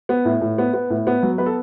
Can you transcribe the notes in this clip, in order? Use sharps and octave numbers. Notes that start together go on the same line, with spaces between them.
B3
A2
A2
B3
B3
A2
B3
F#3
B3 B4
A4